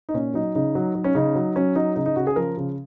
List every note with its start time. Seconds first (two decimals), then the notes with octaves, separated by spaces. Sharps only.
0.09 D#4
0.14 A#2 C#4
0.34 F#3 D#4
0.55 C#3 D#4
0.75 F#3
0.95 F#3
1.04 C#4
1.15 C#3 D#4
1.35 F#3
1.56 F#3 C#4
1.75 F#3 D#4
1.96 C#3 D#4
2.06 D#4
2.16 C#3 F#4
2.27 G#4
2.36 F3 A#4
2.57 C#3